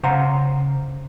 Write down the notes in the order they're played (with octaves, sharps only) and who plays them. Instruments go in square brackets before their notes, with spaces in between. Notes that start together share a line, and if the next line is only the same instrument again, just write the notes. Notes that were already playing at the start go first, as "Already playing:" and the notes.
[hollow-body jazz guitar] C#3 C5 F5 F#5 A#5 C6